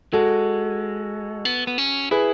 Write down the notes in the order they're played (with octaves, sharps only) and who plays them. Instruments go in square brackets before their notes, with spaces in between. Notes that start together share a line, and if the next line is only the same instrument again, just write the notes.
[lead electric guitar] G#3 [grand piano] F#4 A4
[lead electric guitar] B3
B3
C#4
[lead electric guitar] E4 [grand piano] G#4 B4